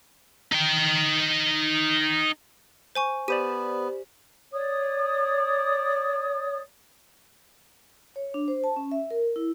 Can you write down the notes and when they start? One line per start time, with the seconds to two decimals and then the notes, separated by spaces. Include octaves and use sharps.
0.52 D#4 G5
2.95 C5 G#5 C#6
3.28 B3 G4 C5 D5 D#7
4.53 C#5 D5 D#6
8.16 C#5
8.34 D4
8.48 C5
8.64 A5
8.76 C#4
8.92 E5
9.11 A#4
9.36 E4